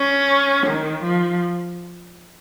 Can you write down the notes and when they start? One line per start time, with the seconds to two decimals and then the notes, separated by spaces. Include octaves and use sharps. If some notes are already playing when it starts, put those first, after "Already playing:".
Already playing: C#4
0.67 D#3
1.04 F3